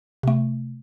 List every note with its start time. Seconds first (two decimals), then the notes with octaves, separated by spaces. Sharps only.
0.23 C3 A3